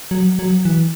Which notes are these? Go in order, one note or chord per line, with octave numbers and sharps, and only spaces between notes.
F#3
F#3
E3